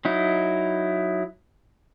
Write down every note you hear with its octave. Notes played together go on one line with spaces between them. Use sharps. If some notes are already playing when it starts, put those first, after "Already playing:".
F#3 D#4 E4